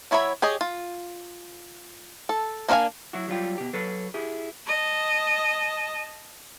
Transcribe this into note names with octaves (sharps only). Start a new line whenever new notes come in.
F#3 E4 C#5 E5 B5
G4 G#4 C#5 D#5
F4
A4
A#3 D4 C5 F5 G#5
F#3 E4 F#4
F#3 G3 F4 G4
B2 G4
F#3 A4 B4
E4 G4 G#4
D#5 A5